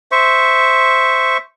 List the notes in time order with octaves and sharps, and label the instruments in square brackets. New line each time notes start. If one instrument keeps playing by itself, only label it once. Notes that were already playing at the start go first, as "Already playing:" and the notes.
[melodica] C5 E5 C#6